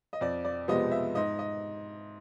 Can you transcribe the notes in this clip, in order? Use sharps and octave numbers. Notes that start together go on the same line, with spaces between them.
D#5
F2 D5
D5
C3 F3 G#3 B3 D#5
E5
G#2 D#5
D#5